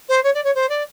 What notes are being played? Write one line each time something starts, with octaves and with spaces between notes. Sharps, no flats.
C5
C#5
D5
C#5
C5
D5